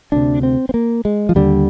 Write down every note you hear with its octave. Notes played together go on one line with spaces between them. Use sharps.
D2 C3 D4
C4
C4
A#3
G#3
F3
D#2 D3 G3